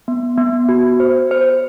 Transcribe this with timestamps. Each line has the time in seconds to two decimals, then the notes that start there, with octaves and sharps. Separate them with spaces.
0.08 B3
0.38 B3
0.69 F#4
1.00 C5
1.31 C5